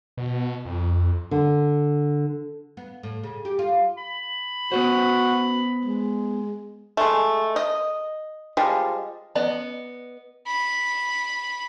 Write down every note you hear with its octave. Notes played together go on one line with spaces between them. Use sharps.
B2
F2
D3
B3
A2
C#3
G4
F4
B5
B3 F#4 B4 C5
G#3
G#3 A3
D#5
F3 G3 G#3
B3 D5 D#5
B5